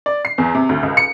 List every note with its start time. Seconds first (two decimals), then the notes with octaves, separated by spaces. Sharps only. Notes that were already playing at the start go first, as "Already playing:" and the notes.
0.06 D5
0.25 C7
0.38 E2
0.55 C3
0.69 D2
0.83 C#2
0.97 C#7